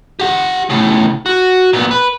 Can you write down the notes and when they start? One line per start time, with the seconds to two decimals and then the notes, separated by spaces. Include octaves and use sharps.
0.20 G4 F#5
0.70 A2 C#3
1.26 F#4
1.73 A#2 B3
1.91 B4